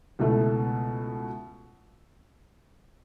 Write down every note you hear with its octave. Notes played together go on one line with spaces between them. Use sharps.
C#2 B2 A3 E4 A4